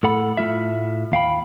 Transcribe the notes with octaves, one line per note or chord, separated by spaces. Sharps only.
A2 A4 F#5 B5
A2 A3 F4 E5
D#2 F5 G5 B5